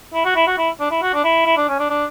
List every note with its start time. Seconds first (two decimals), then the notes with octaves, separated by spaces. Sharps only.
0.13 E4
0.25 F#4
0.35 E4
0.47 F#4
0.58 E4
0.80 D4
0.91 E4
1.02 F#4
1.14 D4
1.24 E4
1.46 E4
1.57 D4
1.68 C#4
1.79 D4
1.89 D4